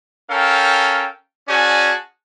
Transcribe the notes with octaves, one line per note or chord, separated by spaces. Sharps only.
C#4 A4 A#4 F5 G5
C#4 F#4 G#4 D5 G#5 A5